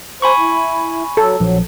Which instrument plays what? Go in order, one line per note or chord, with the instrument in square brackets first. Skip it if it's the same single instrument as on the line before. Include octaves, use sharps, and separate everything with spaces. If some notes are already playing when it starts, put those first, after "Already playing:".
[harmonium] C5 [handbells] G#5 B5 C#6
[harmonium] E4
[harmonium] F#3 [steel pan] A4
[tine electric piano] A#1 F3 [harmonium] F#3